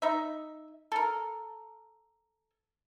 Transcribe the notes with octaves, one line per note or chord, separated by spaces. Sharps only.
D#4 E5
A4 A#4